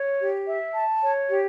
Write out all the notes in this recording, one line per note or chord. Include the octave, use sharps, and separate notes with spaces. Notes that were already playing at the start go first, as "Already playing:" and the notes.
Already playing: C#5
G4
E5
A5
C#5
G4